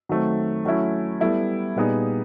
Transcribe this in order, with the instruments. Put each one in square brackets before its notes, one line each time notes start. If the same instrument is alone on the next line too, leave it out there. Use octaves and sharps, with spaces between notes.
[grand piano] D#3 F#3 A3 C4
F#3 A3 C#4 E4
G3 B3 E4 A4
A#2 G3 B3 D#4 G#4